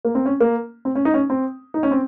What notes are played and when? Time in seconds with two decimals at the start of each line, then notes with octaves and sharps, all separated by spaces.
0.05 A#3
0.15 C4
0.26 C#4
0.40 A#3
0.85 C4
0.95 C#4
1.05 D#4
1.14 C#4
1.30 C4
1.74 D#4
1.83 C#4
1.91 C4